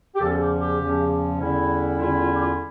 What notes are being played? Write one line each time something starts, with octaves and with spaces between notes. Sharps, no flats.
G4
E2 C#3 F3 C#4 A4
G4
G4
E2 C#3 F3 C#4
E2 D3 G3 C#4 E4
E2 D3 G3 C#4 E4 F4
F4
G4
F4